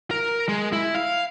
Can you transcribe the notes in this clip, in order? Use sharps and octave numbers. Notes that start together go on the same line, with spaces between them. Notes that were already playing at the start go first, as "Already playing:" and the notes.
A#4
G#3
E4
F5